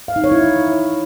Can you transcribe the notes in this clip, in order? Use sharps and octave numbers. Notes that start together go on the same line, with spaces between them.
F5
D#4
C#5
E4